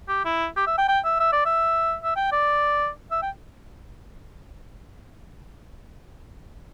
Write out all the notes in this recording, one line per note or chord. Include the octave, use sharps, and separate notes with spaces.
G4
E4
G4
E5
G5
G5
E5
E5
D5
E5
E5
G5
D5
E5
G5